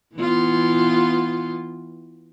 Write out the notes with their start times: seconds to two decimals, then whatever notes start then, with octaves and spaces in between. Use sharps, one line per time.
0.16 E3 B3 F4